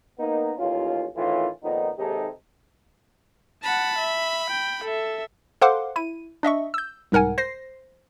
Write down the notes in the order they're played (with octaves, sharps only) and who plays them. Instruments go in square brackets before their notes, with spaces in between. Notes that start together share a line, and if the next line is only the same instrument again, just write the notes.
[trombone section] A#3 B3 D#4
A1 D#2 C#4 F4
A2 D#3 E3 C#4 F4
F2 A#2 D#3 B3 D#4
D#2 C3 G#3 D#4 G4 A4
[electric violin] F#5 A5 [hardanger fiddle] B5
[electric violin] E5
G5
A4 E5
[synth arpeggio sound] A4 C5 F5 F#5 C6 D6
E4 D#7
D4 D#5 E5 C#6
E6 G6
C2 G#2 A#4 F#5 G#5
C5 A#6 C7